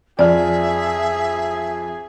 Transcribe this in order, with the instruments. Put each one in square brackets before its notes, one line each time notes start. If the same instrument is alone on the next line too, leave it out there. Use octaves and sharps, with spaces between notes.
[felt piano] F2 F6 [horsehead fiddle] G#4 [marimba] D5 [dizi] E5